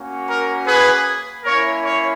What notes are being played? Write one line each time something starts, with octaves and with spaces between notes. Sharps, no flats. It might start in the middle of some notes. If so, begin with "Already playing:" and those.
Already playing: A#3 C#4 F#4
A#4
G#4 B4
A#3 C#4 E4 A#4 C#5
C#5